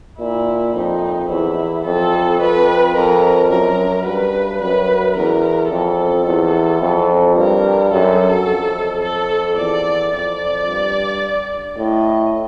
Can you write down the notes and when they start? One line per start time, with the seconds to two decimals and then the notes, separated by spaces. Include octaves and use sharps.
0.19 A#2 E4
0.74 F2 D#4
1.29 E2 E4
1.84 F2 A4
2.41 F2 B4
2.95 F2 A#4
3.50 F#2 A#4
4.05 G2 B4
4.61 F#2 B4
5.16 E2 A#4
5.71 F2 A4
6.26 E2
6.81 F2
7.36 G2 A#4
7.92 F#2 A4
8.47 F2
9.02 A4
9.57 E2 D5
10.12 F2 D5
10.68 G2
11.78 A2 D#5